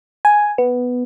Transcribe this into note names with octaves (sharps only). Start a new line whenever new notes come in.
G#5
B3